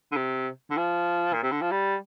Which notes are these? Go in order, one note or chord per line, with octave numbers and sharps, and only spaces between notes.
D3
C3
D3
F3
A#2
C3
D3
F3
G3